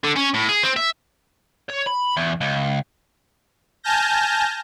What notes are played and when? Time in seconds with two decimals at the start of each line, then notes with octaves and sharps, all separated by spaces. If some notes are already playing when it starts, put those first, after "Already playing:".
0.04 D3
0.16 C#4
0.34 A2
0.49 G#4
0.63 C4
0.77 E5
1.70 C#5
1.87 B5
2.17 E2
2.41 C#2
3.83 G#5 A5 F6 G6 A#6